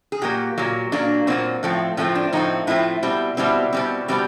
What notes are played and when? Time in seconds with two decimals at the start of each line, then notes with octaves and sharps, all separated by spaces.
0.12 G#4
0.22 A#2 F#3 A#3 G4
0.58 A#2 F#3 A#3
0.92 A#2 F#3 A#3 D4
1.27 A#2 F#3 A#3 C4
1.63 A2 F3 A3 C4
1.97 A2 F3 A3 C4 C#4
2.15 D4
2.33 A2 F3 A3 C4 D#4
2.67 A2 F3 A3 C4 E4
3.03 B2 G3 C4
3.37 B2 G3 C4 E4
3.73 B2 G3 C4
4.08 B2 G3 C4